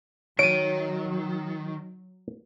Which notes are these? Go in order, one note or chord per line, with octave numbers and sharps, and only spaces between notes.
D#3 F#3 C#5 D7 D#7